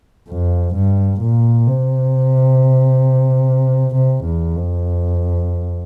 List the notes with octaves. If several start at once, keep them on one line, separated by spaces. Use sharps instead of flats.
F2
G2
A#2
C3
C3
E2
F2